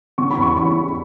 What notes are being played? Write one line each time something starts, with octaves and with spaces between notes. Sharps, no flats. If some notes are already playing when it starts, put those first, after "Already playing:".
C#3 C#6
B5
E2
C#6
E3 C#6